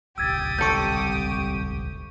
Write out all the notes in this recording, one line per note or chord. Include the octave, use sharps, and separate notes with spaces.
D#1 G#1 C#2 G4 D#6 E6 G#6 A6
C2 A4 C#6 G6